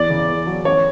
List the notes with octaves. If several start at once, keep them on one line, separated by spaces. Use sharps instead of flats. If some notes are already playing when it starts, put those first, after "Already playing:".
Already playing: E2 D5
C#3
E2
F#3
A1 C#5